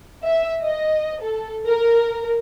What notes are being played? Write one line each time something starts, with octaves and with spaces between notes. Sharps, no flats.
E5
D#5
A4
A#4